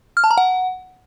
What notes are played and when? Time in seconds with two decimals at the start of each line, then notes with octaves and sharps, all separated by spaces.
0.17 F6
0.24 A5
0.31 A#5
0.38 F#5